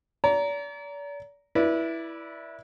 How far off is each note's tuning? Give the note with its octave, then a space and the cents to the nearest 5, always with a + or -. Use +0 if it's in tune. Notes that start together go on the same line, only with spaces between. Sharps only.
D5 -40 A#5 +0
E4 +0 B4 -30 D5 +0